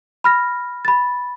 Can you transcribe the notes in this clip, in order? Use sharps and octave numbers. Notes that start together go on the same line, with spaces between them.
B5 F6 A#6
B5 A6